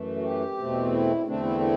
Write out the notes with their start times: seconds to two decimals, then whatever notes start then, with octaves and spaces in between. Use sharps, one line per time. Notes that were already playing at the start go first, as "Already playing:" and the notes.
Already playing: F#2 E3 A3
0.17 F#4
0.23 G4
0.57 E2 B2 A3 C4
0.92 E4
1.26 E2 D3 A3 C4 D4
1.43 E4
1.60 E4